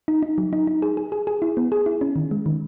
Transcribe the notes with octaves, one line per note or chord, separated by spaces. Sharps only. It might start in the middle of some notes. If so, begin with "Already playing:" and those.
D#4
D#4
F#3
D#4
D#4
G#4
G#4
G#4
G#4
E4
B3
G#4
E4
C#4
D#3
G#3
D#3